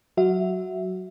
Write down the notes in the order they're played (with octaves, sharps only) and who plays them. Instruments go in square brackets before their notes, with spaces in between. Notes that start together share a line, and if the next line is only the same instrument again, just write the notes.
[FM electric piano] F#3 F#4 E5